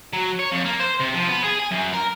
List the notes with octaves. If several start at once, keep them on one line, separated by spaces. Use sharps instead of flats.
F#3
C#5
F2
A#3
C5
C3
F3
B3
G#4
G#5
F#2
A#4